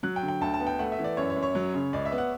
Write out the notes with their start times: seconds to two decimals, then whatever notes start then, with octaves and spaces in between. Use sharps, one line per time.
0.03 F#3 F#6
0.16 G5
0.23 D3
0.28 G5
0.41 D2 A5
0.54 A5
0.60 B3
0.67 G5
0.79 A3 F#5
0.92 E5
0.99 E3
1.04 D5
1.17 F#2 C#5
1.30 C#5
1.36 F#2
1.43 C#5
1.55 F#3
1.74 C#3
1.93 C#2 D5
2.05 E5
2.12 B3
2.18 F#5